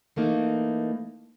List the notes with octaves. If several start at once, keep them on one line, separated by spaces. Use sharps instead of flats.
E3 A3 A#3 D#4